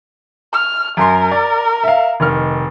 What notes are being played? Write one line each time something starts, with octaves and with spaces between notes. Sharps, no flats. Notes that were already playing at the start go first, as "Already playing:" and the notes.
F6
F#2 A#4 C6
D5
E5 F5
F1 D#3 F6